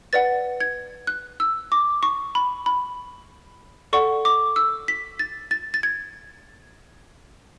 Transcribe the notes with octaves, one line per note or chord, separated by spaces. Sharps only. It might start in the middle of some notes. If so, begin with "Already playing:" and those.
B4 D5 F#5 A6
G#6
F#6
E6
D6
C#6
B5
B5
A4 D5 F#5 C#6
D6
E6
B6
A6
A6
A6
G#6